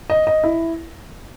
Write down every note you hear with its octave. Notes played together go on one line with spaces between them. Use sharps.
D#5
D#5
E4